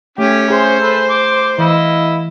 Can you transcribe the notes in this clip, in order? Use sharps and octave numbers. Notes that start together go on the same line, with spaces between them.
A3 C#4 G4
G#4 C5
A4 B4
D6
E3 E4 D#5 F5